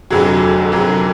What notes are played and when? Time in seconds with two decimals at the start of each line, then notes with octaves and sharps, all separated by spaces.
0.10 F1 F2 D3 F#3 F#4 G#4
0.72 F1 F2 D3 F#3 G#4 A#4